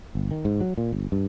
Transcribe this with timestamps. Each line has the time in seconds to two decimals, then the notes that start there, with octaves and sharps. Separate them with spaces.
0.15 G1
0.31 D#3
0.45 G#2
0.61 F#3
0.78 A#2
0.92 G1
1.12 G2